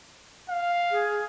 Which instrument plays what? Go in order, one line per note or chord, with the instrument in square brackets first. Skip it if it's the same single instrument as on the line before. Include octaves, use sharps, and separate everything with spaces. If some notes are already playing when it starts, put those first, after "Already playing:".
[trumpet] F5
[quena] G#4